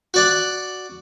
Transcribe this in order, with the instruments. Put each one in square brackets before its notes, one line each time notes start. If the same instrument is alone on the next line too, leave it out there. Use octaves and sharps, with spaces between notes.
[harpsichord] F#4 D5 F#5